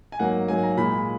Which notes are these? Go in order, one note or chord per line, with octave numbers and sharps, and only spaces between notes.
G#5
G#2 F#3 A#3 F#5
G#2 F#3 A#3 G#5
A#5
A#2 G#3 B5